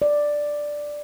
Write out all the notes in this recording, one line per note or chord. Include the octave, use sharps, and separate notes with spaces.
D5